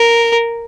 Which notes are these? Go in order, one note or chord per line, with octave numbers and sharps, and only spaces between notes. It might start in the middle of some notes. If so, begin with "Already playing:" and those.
Already playing: A#4